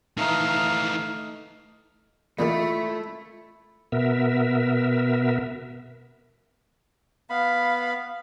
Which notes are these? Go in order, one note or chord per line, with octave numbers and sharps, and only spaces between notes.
D#3 E3 A3 D#4 F5
E2 A#2 D#3 A3 E4 F4
B2 B3 A#4 E5
B3 F5 B5